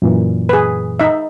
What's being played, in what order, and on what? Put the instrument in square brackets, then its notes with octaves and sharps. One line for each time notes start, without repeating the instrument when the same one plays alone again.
[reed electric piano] F#2 A#2 E3
[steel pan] G#4 B4
D#4 E5